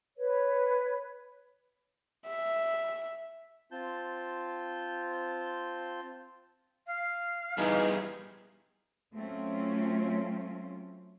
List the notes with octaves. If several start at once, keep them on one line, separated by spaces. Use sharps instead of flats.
B4 C#5
E5
C4 F4 A5 G6
F5
E3 G3 B3 D#4 G#4
F#3 A3 C4 C#4 F4